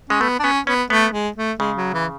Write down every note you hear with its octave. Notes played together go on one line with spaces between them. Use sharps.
G#3 C#4
A3 B3
D4
B3 C#4
B3 C#4
A3 B3
G#3
A3
C#3 G#3
F#3
E3